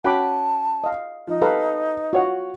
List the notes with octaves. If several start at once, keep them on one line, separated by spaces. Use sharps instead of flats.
C#4 F#4 F#5 G5 A5 B5 D6
D#5 F5
F3 D#4
G4 A4 B4 F5 A#5
F4 F#4 C#5 F#5